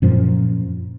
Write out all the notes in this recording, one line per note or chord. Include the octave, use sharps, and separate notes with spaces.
F#2 A#2 F3